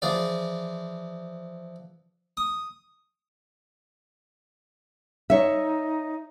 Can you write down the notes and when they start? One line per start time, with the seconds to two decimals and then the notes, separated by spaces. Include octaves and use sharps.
0.02 E3 F3 G#4 D5
2.37 D#6
5.30 D#4 C#5 E5